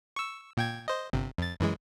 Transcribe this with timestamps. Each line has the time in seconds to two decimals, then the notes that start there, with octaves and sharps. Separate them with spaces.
0.16 C#6 E6
0.57 A#2 G5 G#6
0.88 C5 D#5
1.13 G1 C3
1.38 F2 A6
1.60 F#2 E3 G#3